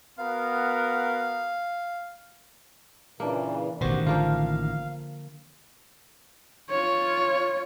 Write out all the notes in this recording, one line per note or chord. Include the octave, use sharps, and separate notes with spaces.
B3 F#4 A#4 F5
A#2 C#3 E3 A#3 D4
A1 B2 D#3 F#4 G4 C5
D3 F3 A#3 F4 F5
F4 C#5